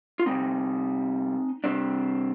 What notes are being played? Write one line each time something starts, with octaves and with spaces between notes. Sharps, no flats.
F4
C3 G3 A#3 C4 D#4
C3 G3 C4 D4